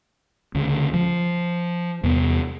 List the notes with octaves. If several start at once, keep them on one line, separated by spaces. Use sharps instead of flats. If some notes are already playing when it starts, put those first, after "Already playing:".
D2 C#3
F3
E2 C3 B3